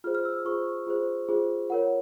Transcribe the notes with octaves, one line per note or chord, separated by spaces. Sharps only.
F4 G#4 C5 F6
F6
E6
F4 G#4 C5 C#6
F4 G#4 C5
F4 G#4 C5
F4 A#4 C#5 F#5